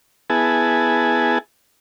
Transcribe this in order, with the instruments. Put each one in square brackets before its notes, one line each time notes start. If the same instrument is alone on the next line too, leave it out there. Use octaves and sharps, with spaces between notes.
[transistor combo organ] B3 E4 G#4 G#5 A5